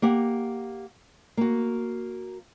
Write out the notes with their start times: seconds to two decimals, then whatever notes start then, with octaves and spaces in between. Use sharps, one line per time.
0.02 A#3 G4 F#5
1.37 A#3 F#4